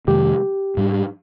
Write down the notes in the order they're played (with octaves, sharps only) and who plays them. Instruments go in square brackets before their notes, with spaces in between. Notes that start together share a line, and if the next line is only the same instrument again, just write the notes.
[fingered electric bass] F2 C3 D#3 G#3 [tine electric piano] G4
[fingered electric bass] G#2 G3 D4